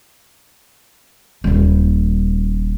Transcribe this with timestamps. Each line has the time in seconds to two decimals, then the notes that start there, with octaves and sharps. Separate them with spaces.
1.44 D#1 G3